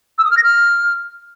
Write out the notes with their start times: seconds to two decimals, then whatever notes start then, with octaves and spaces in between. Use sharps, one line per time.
0.18 E6
0.25 D#6
0.31 F6
0.37 A#6
0.43 F6